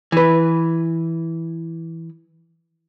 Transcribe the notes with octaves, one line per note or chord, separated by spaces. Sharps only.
E3 B4